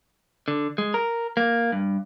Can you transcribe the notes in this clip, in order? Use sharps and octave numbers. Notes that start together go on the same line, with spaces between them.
D3
G#3
A#4
A#3
G2